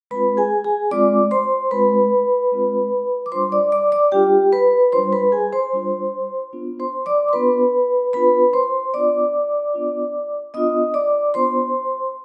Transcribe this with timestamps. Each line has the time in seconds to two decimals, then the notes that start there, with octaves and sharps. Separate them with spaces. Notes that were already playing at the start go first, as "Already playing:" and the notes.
0.11 G#3 C4 F4 B4 B5
0.37 G#4 G#5
0.64 G#4 G#5
0.91 G#3 C4 F4 D5 D6
1.31 C5 C6
1.71 G#3 C4 F4 B4 B5
2.52 G#3 C4 F4
3.26 D6
3.32 G3 D4 F4 C5 C6
3.52 D5 D6
3.72 D5 D6
3.92 D5 D6
4.12 G3 D4 F4 G4 G5
4.52 B4 B5
4.92 G3 D4 F4 C5 C6
5.12 B4 B5
5.32 G#4 G#5
5.53 C5 C6
5.73 G3 D4 F4
6.53 B3 D4 F4
6.80 C5 C6
7.06 D5 D6
7.29 C6
7.33 B3 D4 F4 B4 B5
8.13 B3 D4 F4 B4 B5
8.53 C5 C6
8.94 B3 D4 F4 D5 D6
9.74 B3 D4 F4
10.54 B3 D4 F4 D#5 D#6
10.94 D5 D6
11.34 B3 D4 F4 C5 C6